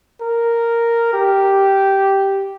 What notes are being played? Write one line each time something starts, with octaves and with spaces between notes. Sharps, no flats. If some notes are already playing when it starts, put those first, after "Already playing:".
A#4
G4